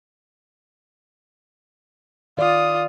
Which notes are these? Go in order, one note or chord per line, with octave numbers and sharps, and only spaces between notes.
D#3 F4 D5 D#6